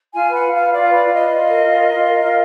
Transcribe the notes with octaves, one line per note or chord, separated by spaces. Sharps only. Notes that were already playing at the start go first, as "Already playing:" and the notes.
F4 G#5
B4
F#5
F4
B4 F5
F4 D5
B4 D5
F4
D#5
B4
F4
A#4
F4
A#4
F4
A#4
F4